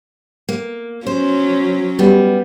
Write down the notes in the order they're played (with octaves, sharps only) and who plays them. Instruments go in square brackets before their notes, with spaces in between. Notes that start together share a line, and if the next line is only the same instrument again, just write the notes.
[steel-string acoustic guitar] A#3
[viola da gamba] F#3 C#4 [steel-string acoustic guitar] C5
[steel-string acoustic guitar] G3 B3